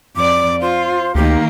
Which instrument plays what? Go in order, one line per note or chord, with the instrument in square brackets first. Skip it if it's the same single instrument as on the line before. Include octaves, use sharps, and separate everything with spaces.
[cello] F2 D5 [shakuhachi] D6
[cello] F4 [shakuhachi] C5
[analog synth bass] D2 [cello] D#3 A#3 [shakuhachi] G4